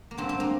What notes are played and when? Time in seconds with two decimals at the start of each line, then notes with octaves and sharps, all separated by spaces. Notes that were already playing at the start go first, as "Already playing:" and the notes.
0.11 A#3
0.18 G2 D3 C4
0.29 C4
0.40 A#3